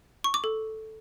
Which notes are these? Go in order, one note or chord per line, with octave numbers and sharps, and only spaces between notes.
C#6
D6
A4